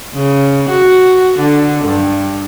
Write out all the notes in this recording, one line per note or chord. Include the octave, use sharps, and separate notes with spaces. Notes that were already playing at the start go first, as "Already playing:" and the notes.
C#3
F#4
D3
G2